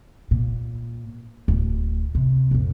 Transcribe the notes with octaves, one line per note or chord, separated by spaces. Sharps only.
A#2
D1
C3
A#1 F2